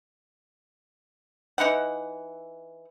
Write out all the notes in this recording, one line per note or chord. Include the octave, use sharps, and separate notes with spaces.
E3 D#4 E4 F#5